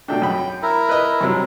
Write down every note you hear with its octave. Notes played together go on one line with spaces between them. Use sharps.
B2 A3 D4 G5
G#1 F#2 B5
E4 A#4
B4 D#5
G2 C3 F#3